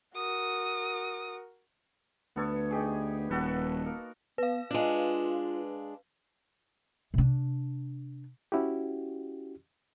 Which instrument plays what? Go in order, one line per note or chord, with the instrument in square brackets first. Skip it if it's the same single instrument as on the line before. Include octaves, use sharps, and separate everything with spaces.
[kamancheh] F#4 A#4 [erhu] D#6
[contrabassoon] D2 [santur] B3 A4 C#5
[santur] D#4 G4 G#4
[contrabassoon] D#1 [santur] F#4 A4 B4
[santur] A#3
[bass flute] B3 [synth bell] B4 F5
[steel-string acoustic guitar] G#3 D4 [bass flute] F4
[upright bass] C3 D4
[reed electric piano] C#4 E4 F#4 G4